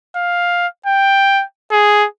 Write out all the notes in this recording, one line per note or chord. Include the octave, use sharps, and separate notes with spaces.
F5
G5
G#4